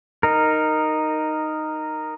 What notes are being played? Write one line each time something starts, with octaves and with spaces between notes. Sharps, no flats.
D#4 A#4